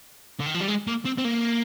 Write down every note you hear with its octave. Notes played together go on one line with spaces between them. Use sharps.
D3
D#3
F3
G3
G#3
A#3
C4
C4
A#3